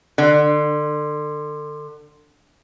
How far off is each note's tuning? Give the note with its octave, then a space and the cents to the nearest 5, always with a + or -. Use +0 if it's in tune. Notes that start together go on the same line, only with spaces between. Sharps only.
D3 +30